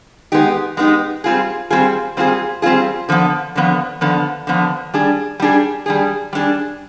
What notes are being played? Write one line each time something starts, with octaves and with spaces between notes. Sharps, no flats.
G#3 B3 D#4 G4
G#3 B3 D#4 G4
G3 C4 F4 G#4
G3 C4 F4 G#4
G3 C4 F4 G#4
G3 C4 F4 G#4
D3 F3 B3
D3 F3 B3
D3 F3 B3
D3 F3 B3
G3 D4 G#4
G3 D4 G#4
G3 D4 G#4
G3 D4 G#4